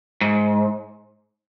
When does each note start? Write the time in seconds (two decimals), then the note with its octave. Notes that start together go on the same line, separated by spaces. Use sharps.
0.21 G#2